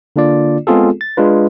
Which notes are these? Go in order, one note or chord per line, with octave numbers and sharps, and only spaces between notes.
D3 A#3 D4 F4 D5
G#3 B3 C4 F4 G#4 A4
A6
G#3 D4 F4 B4